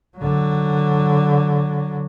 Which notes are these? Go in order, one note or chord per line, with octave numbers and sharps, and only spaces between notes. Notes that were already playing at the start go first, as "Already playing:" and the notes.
D3 F#3